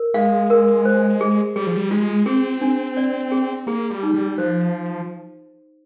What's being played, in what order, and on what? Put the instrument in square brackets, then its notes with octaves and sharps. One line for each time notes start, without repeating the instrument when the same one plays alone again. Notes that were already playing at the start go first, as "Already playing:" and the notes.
Already playing: [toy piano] A#4
[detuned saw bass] G#3 [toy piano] F5
[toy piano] A#4
C5
G#4
[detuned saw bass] G3 [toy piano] G#4
[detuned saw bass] F3
G3
[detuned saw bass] G#3 [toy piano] F4
[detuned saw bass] C4 [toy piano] G#4
[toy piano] D4
D5
G#4
[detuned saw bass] A#3 [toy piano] G#4
[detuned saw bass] G3
[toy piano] D#4
[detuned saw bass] G3
[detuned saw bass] F3 [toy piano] C5